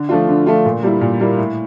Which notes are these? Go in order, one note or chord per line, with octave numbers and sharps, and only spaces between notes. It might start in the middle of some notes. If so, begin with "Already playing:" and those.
Already playing: D3
F3 A3 D4 F4
D3
F3 A3 D4 F4
A#2
G3 A#3 E4
A#2
G3 A#3 E4
A2